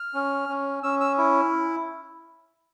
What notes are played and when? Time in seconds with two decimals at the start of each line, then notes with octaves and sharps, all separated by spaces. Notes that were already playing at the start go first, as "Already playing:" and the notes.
Already playing: F6
0.14 C#4
0.49 C#4
0.83 C#4 E6
1.00 E6
1.18 E4